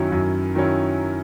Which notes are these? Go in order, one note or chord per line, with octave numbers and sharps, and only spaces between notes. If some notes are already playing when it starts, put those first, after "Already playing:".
Already playing: F#2 D#3 F#3 C#4 E4
F#2
D#3 F#3 C#4 E4